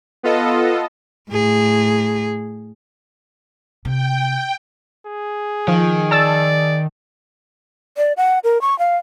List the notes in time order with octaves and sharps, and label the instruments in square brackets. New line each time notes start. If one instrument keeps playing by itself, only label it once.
[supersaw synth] B3 F4 A4 D#5
[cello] A2 G#4
[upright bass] C3 [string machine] G5
[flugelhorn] G#4
[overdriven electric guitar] D#3 [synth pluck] F3
[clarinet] D5 [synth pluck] A5 E6 A6
[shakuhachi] D5
F#5
A#4
C#6
F5